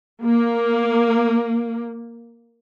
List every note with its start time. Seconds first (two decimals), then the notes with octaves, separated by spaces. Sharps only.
0.23 A#3